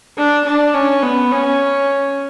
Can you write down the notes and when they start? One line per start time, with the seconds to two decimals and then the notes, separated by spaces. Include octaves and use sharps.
0.18 D4
0.46 D4
0.74 C#4
1.03 B3
1.31 C#4